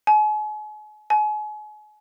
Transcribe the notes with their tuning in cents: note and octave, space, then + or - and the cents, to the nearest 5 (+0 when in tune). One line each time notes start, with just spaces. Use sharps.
G#5 +40
G#5 +35